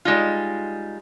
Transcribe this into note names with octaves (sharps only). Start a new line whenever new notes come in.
G3 G#3 D#4 F4